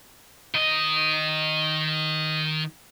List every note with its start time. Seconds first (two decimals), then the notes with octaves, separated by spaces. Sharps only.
0.54 D#3 D#5